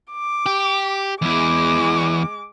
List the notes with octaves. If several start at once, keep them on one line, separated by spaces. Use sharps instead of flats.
D6
G4
E2 E3 G#3 D6